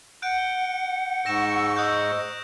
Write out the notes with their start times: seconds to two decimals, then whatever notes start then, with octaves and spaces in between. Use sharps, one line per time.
0.22 F#5 F#6 G6 D7
0.38 G7
1.26 G#2 C#6 E6 A#6 D7 E7
1.76 D#5 D#6 F#6 G6